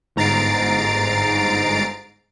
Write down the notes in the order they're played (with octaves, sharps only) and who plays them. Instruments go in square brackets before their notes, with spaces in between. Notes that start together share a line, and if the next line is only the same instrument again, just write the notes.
[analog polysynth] G1 G#2 A#5 A6 C7 D7